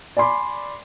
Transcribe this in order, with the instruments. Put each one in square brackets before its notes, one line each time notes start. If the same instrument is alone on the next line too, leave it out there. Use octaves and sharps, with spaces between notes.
[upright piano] D5 G#5 B5 C6 D6